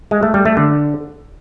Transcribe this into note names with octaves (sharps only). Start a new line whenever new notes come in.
G#3
A3
G3
A3
D3